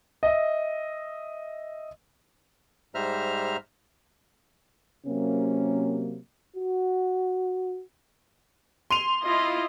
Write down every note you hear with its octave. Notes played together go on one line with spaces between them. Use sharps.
D#5 E5
G#2 G3 C5 E5 A#5 F6
C3 F#3 A#3 C#4
F#4
C6 D#7 F7
E4 F4 D#5